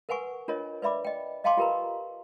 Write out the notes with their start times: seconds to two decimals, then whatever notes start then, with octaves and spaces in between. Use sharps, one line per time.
0.09 A#4 B4 F#5 G#5 C#6
0.48 D4 F4 A#4 C#5 D#5
0.82 B4 D5 E5 B5 D6
1.05 D#5 G5
1.44 D#5 F5 G5 A5 C6 D6
1.57 F4 G4 A#4 B4 A#5